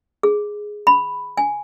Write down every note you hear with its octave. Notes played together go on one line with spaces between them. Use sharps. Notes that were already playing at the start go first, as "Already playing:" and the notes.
G#4
B5
G#5